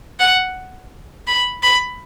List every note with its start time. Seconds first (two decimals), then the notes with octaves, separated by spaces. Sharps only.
0.20 F#5
1.27 B5
1.63 B5